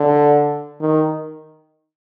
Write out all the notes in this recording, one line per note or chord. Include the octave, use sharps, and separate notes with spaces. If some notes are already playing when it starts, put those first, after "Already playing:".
Already playing: D3
D#3